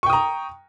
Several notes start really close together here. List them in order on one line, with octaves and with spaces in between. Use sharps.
C#6 G5 D#6 A#5